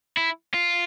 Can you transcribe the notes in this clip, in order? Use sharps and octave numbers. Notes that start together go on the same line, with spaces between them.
E4
F4